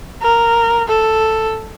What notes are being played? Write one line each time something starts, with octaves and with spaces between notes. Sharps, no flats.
A#4
A4